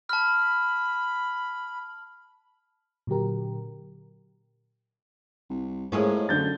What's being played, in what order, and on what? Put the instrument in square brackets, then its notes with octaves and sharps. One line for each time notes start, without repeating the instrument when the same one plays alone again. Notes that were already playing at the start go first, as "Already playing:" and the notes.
[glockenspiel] A5 F6 [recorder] B5
[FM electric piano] A#2 D3 F#3 G4 A#4
[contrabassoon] C2
[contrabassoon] A2 [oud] G#3 A#3 C#4 [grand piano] F4
[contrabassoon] F#2 [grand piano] D3 G6 A6